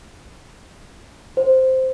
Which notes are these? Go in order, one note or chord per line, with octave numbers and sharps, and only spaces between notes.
C5